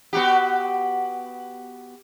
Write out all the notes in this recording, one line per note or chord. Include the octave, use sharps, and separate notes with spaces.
B3 F#4 G4